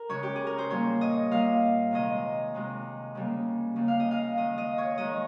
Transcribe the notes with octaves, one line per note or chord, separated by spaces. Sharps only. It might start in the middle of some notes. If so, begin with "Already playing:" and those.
Already playing: A#4
C#3 G#3 C#5
G4
G#4
A#4
C5
A#2 G3 A#3 C#5
D#5
A#2 G3 A#3 F5
C3 D#3 G#3 D#5
C3 D#3 G#3
C#3 G3 A#3
C#3 G3 A#3
F5
D#5
F5
D#3 G#3 D#5
D#5
C#5
D#3 G#3 D#5